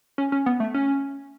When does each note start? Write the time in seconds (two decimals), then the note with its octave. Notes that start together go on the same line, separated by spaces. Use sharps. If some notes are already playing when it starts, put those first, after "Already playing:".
0.18 C#4
0.32 C#4
0.46 B3
0.60 A3
0.74 C#4